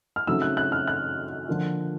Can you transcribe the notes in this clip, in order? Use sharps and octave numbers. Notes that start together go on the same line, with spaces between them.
F6
C#3 F#3 A3 C4 D#4 E6
F#6
F#6
F6
F#6
D3 F3 A#3 D4 F4